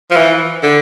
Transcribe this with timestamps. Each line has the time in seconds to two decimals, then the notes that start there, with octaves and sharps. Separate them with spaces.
0.11 F3
0.16 E3
0.63 D3